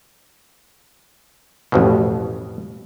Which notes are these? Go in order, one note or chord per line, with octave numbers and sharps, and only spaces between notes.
A1 F2 B2